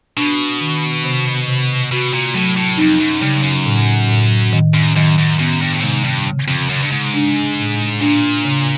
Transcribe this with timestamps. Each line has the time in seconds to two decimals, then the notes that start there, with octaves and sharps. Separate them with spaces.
0.17 B2 D4
0.61 D#3
1.04 C3
1.48 C3
1.91 B2 F#4
2.13 A#2
2.34 A2 F#3
2.56 A2
2.78 F2 D#4
3.00 F#2
3.22 G2 C#3
3.43 F#2
3.66 A2
4.09 A2
4.53 D#3
4.74 F#2
4.96 F#2 D#3
5.18 F#2
5.39 F#2 B3
5.61 G2
5.73 A2
5.82 G#2 C3
6.04 G2
6.26 C#3
6.48 F2
6.70 F#2 C#3
6.83 G2
6.92 G#2
7.14 D4
7.58 A2
8.01 A#2 D4
8.45 C#3